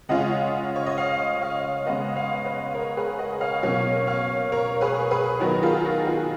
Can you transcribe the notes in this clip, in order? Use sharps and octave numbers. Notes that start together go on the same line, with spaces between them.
C#3 G#3 C#4 F4 D#5 F#5
C#5
D#5
C#5 F5
C#5 F5
C#3 G#3 B3 D#5 F#5
C#5 F5
B4 D#5
A#4 C#5
G#4 B4
D#5 F#5
C#5 F5
B2 F#3 A#3 C#4 C#5 F5
C#5 F5
A#4 C#5
G#4 B4
G#4 B4
D#3 F#3 B3 D#4 F#4 A#4
F4 G#4
F#4
F4 G#4